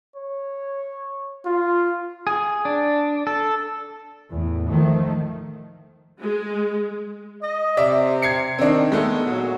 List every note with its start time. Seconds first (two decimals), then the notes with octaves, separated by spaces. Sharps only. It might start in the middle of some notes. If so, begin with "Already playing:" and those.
0.16 C#5
1.45 F4
2.27 G#4
2.65 D4
3.27 A4
4.31 E2 A2
4.69 D#3 F3 A3
6.21 G#3
7.42 D#5
7.77 C3 D5 E5
8.22 G#6 C7 C#7
8.59 D#3 C4 D4
8.92 G#3 A3 B3
9.25 A#2 F#3